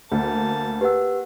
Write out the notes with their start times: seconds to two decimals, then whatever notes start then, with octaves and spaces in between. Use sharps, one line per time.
0.12 D2 A#3 A5
0.81 G4 B4 F#5 E6